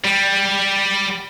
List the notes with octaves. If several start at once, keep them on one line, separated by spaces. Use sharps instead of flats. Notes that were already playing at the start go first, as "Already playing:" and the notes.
G3